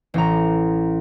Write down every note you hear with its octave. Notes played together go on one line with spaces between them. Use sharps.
A1 A#5